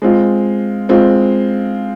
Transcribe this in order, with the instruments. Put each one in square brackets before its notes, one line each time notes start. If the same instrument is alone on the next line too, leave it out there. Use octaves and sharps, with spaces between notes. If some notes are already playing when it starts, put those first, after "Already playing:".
[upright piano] G#3 C4 F4
G#3 C4 F4